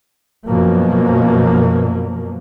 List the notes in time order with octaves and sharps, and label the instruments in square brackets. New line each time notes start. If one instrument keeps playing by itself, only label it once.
[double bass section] F#2 B2 F3 A#3